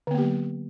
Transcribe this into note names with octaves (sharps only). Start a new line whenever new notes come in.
D3 F#3 A#3 B3 G4